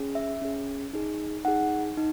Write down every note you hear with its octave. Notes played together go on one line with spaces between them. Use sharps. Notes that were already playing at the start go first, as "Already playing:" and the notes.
Already playing: C#4 G#4
E5
C#4 G#4
D#4 G#4
D#4 G#4 F#5
D#4